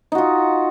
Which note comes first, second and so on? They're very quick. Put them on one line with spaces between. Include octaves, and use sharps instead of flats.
D#4 F#4 F4